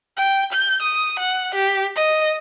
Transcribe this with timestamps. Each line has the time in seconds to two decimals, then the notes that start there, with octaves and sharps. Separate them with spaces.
0.17 G5
0.53 G6
0.82 D#6
1.19 F#5
1.55 G4
1.96 D#5